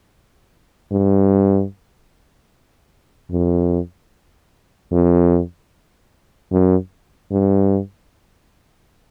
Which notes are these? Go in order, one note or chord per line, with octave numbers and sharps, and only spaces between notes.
G2
F2
F2
F#2
G2